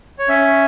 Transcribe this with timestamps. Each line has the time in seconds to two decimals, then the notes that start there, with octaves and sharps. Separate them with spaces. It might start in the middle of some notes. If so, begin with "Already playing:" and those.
0.19 C#5
0.28 C#4 E5